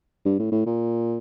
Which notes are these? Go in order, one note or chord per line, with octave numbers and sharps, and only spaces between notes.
G2
A2
A2
A#2